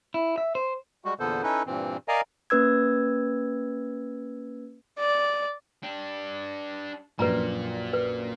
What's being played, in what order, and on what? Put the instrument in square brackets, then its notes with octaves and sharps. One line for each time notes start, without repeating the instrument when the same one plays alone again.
[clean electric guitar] E4
E5
C5
[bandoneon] G3 G#3 F#4
E2 A#2 D3 B3 A4 C5
C#4 D#4 E4 A4 B4
G2 A#2 E3 C4
A#4 D5 D#5 F5 G#5 A#5
[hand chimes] A#3 C#4 B4 E6 G#6
[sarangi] D5
[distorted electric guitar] D4 G4
[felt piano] A#1 F#2 [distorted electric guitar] A#2 A#3 [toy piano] B4 A#5
[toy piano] B4